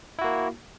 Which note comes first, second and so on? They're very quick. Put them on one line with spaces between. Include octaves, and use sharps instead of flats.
E4 F#4 A#3